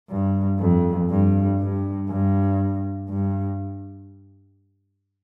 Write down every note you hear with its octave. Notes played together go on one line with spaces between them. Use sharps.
G2
F2
G2
G2
G2
G2